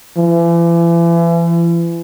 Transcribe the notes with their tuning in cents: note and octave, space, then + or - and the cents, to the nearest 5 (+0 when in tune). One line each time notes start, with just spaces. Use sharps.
E3 +40